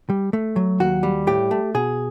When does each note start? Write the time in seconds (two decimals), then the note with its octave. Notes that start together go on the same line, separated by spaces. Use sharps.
0.10 G3
0.33 A3
0.56 F#3
0.80 D#2 F#4
1.03 G3
1.27 A2 G4
1.51 A3
1.74 B2 G#4